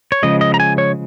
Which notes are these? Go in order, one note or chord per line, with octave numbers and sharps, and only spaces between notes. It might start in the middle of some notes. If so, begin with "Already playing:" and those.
C#5
C#3 F3 G#3 D#5
D#5
A#5
G#5
C#5